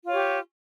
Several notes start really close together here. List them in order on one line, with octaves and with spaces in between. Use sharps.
F4 C#5 G4